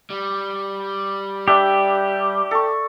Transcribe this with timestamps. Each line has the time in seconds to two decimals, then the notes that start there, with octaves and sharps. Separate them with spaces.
0.10 G3
1.48 D4 G4 E5
2.51 A4 C#6